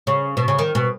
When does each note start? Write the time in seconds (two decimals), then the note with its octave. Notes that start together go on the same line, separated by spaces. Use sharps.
0.07 C#3
0.37 B2
0.48 C#3
0.59 D#3
0.75 B2